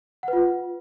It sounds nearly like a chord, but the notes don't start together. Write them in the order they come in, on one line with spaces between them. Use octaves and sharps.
F#5 B4 F4